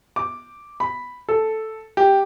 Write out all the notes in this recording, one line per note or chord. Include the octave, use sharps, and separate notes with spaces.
D6
B5
A4
G4